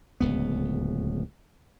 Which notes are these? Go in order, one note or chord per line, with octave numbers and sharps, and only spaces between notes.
D1 C#2 B3